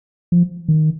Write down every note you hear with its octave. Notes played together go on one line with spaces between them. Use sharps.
F3
D#3